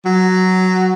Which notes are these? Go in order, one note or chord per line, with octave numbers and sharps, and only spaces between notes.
F#3